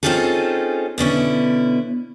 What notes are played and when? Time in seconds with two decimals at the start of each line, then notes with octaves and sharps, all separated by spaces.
0.03 C4 C#4 D#4 F4 G#4 A4
0.98 B2 D3 C#4 E4